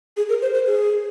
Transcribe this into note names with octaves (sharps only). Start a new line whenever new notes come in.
G#4
A#4
C5
C5
G#4